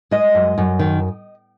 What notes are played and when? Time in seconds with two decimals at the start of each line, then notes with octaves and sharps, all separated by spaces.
0.11 G#3 D#5
0.35 F#2
0.58 F#2
0.79 D#3